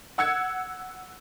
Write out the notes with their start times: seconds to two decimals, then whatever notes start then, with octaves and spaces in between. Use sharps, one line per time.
0.18 F#5 E6 G#6 C#7